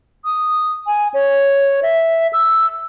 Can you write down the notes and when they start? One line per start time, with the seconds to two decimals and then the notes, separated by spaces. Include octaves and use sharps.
0.25 D#6
0.87 G#5
1.14 C#5
1.83 E5
2.33 E6